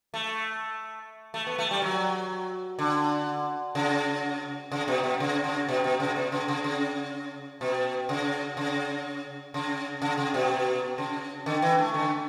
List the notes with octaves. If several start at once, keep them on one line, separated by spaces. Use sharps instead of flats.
A3
A3
B3
A3
G3
F#3
D3
C#3
C#3
B2
B2
C#3
C#3
B2
B2
C#3
B2
C#3
C#3
C#3
B2
C#3
C#3
C#3
C#3
C#3
B2
C#3
D3
E3
A3
D3